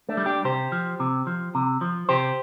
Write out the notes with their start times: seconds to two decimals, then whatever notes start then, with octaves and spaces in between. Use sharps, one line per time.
0.09 A3 D4
0.17 G3
0.26 D4 G4
0.44 C3 G4 C5
0.72 F3
1.00 C3
1.27 F3
1.55 C3
1.81 F3
2.09 C3 G4 C5